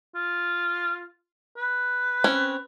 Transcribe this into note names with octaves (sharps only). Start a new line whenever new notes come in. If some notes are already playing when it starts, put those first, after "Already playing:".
F4
B4
C4 C#4